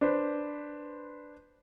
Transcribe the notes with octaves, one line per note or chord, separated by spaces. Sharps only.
D4 B4 C5